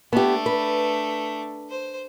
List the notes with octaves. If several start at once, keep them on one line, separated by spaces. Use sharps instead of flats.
A3 B3 D4 G4
B4
C5